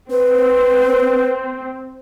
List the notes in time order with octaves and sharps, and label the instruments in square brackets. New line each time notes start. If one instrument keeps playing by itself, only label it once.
[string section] C4 [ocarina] B4